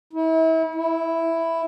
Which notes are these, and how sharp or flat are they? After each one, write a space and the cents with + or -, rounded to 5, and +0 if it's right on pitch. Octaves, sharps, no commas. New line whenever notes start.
E4 -35
E4 +0